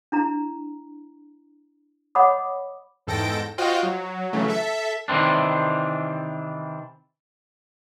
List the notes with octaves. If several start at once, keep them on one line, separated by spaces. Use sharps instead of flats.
D4 E4 A#5
C#5 D#5 F#5 B5 D6 D#6
E2 G#2 A4 G5 A#6 D7
F4 F#4 C5 D#5 F5 G5
F#3
C#3 E3 F#3 A3
A4 E5
C3 D#3 E3 C4 D4